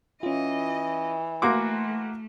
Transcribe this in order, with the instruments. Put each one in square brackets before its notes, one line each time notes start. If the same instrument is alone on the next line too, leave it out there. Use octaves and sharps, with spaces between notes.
[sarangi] E3 [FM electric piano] C#4 F4 [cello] D#5
[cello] A3 [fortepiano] A#3 F#4 D6 [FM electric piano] C6